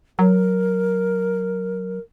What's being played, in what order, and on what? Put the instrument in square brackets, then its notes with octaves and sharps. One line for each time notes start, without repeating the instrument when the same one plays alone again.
[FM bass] F#3 [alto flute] A#4